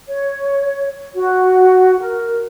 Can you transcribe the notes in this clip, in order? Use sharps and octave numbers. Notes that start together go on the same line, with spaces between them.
C#5
F#4
A#4